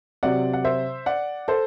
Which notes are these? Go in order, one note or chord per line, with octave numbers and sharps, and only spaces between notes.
C3 F#3 C4 D5 F#5
F#5
C5 E5
D5 F#5
A4 C5